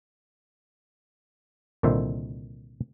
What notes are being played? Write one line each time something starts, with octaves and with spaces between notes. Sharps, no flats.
C2 A#2 D3 D#3 C5 E5